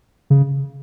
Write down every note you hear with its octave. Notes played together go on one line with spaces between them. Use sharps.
C#3